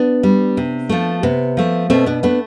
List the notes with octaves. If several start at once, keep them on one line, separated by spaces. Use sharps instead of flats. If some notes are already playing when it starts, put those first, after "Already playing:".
Already playing: B3 D4
G3
C3
F3 A3
C3 B3
F3 A3
B2 A3 C4
B3 D4
A3 B3 D4